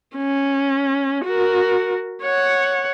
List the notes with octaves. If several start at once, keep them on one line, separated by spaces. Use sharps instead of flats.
C#4
F#4 A#4
C#5 F#5